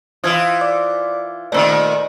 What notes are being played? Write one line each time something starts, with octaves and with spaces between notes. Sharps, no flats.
E3 F4 C5 D#6 G#6
D5 D6
A#2 D3 D#3 A3 C5 D5 E6